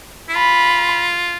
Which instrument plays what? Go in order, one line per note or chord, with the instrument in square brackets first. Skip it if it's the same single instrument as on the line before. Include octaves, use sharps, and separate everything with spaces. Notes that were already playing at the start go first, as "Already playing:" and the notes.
[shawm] E4
[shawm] F4 [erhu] B5